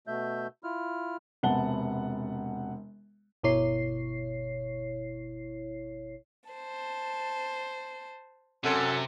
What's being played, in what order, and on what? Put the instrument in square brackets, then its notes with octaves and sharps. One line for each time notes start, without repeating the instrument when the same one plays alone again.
[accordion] B2 A3 E5 G6
E4 F4 F6
[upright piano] E1 C3 B3 F#5 A5 G7
[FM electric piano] G1 B2 E4 C#5 C7
[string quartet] C5 A5
[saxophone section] F#2 A4 [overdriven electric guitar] C3